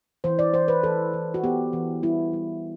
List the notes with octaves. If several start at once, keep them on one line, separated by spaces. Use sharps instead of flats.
E3 C5
D5
E3 C5
B4
E3 A4
E3
F#4
B3 G4
E3
G3 E4
G3